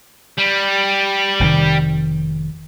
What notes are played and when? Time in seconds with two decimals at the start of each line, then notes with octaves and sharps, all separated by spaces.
0.38 G3
1.40 F1 C3 D#3